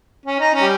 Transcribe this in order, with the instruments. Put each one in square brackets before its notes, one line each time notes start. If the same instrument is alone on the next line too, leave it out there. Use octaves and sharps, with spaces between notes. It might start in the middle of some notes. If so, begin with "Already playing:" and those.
[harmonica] C#4
D#4
C#4
[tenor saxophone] G3